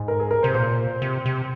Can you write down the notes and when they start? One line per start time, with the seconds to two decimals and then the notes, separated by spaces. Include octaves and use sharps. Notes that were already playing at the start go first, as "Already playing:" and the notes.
Already playing: G#2
0.08 A#4
0.20 G#4
0.31 A#4
0.43 C3 C5
0.54 A#2 C5
1.02 C3
1.26 C3